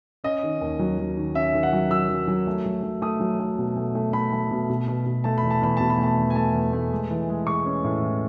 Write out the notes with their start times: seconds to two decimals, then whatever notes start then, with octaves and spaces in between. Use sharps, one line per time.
0.24 C#4 D#5
0.43 D#3
0.61 D#2
0.79 F#3
0.99 F#3
1.17 D#3
1.35 C#4 E5
1.54 D#3
1.63 F#5
1.73 F#3
1.91 F#3 E6
2.09 F#3
2.28 F#3
2.47 A3
2.65 F#3
2.83 F#3
3.02 A3 D#6
3.20 F#3
3.39 A3
3.58 B2
3.76 A3
3.95 A3
4.13 A3 B5
4.32 A3
4.51 B2
4.70 B2
4.88 B2
5.06 B2
5.24 A3 A5
5.38 E2 B5
5.51 A5
5.61 E2 B5
5.77 B2 A5
5.90 B5
5.98 A3
6.03 A5
6.17 E2
6.30 G#5
6.35 A3 A5
6.54 E2
6.73 A3
6.92 G#3
7.11 E3
7.29 G#3
7.47 G#3 C#6
7.66 C#4
7.84 A2
8.03 E3